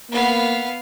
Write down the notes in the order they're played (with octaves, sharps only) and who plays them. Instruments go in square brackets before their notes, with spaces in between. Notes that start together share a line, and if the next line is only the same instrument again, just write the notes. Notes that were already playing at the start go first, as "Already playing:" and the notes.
[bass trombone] A#3 [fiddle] B3 F5